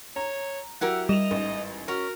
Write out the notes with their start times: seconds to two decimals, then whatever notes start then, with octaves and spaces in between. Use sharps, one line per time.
0.16 C#5 A#5
0.81 F#3 E4 G4 A#4 F#5
1.09 G3 D#5 E7 F7
1.31 A1 G#2
1.88 C#4 F#4 A#4